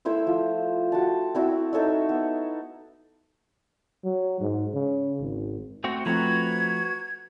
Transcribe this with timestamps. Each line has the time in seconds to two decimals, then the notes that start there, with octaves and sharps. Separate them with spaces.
0.05 A3 E4 C5 E6
0.27 F3
0.92 F#4 G5 A5
1.35 C4 E4 F#4
1.73 D#4 A4 C#5 E5
2.09 B3
4.04 F#3
4.40 G#2
4.74 C#3
5.20 G#1
5.84 A3 C4 F#4
6.06 F3 A3 C4 F#4 B4 A#5 G#6